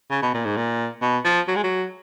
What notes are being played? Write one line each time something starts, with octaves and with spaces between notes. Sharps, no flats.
C#3
B2
A#2
G#2
A#2
B2
F3
F#3
G#3
F#3